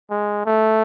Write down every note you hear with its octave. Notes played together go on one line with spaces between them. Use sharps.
G#3
A3